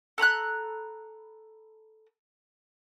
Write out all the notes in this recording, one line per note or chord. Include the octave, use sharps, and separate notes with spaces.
A4 A#5 B5 F#6